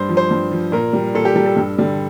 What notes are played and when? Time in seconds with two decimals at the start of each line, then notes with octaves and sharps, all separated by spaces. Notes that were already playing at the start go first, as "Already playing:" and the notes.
Already playing: G2 C5
0.09 F3
0.17 C5
0.31 G2
0.51 F3
0.72 A#2 A#4
0.93 G3
1.15 A#2 A4
1.25 G4
1.36 G3 A4
1.46 A4
1.56 G2
1.78 D3 G3